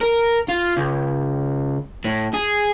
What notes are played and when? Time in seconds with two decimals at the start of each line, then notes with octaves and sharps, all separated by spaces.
0.01 A#4
0.48 F4
0.77 C#2
2.04 A2
2.34 G#4